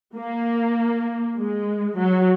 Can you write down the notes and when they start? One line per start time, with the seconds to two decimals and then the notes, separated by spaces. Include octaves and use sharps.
0.16 A#3
1.38 G#3
1.98 F#3